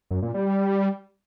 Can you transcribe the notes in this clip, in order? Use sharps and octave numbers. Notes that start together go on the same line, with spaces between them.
F#2
A#2
G3
G3